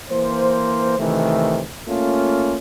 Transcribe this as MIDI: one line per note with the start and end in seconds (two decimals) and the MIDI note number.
0.11 0.97 52
0.11 0.97 58
0.11 0.97 72
0.98 1.62 48
0.98 1.62 51
0.98 1.62 52
0.98 1.62 57
1.88 2.58 57
1.88 2.58 58
1.88 2.58 61
1.88 2.58 65